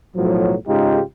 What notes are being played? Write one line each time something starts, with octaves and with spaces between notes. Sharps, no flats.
B1 A2 F3 F#3
G#2 C#3 G#3 D#4 F4 G4